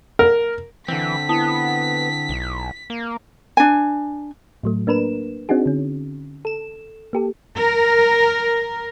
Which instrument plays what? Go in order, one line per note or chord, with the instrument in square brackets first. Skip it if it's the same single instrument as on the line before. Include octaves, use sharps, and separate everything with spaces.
[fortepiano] A#4
[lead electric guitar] D3 C4 [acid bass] E3 [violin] B6
[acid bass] B3 [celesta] E4 A5 D#6
[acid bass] B1
A#3
[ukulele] D4 G#5
[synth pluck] A2 F#3 A3
A#3 D4 A#4 B4 E7
C4 D4 D#4 F#4 G#4
D3 C#4
A4 E7
A#3 G4 A4
[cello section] A#4